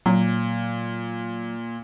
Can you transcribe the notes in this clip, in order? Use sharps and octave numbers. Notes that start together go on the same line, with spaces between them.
A#2 F#3